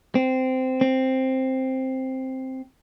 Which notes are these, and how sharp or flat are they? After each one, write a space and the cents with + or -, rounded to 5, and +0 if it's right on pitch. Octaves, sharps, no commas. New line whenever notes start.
C4 -15
C4 +5